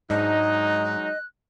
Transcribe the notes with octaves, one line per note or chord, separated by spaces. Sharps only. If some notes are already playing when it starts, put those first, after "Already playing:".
G#2 F#3 G#3 D4 D#4 D#5 F#6